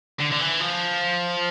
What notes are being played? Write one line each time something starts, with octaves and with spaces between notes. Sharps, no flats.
D3
D3
E3
F3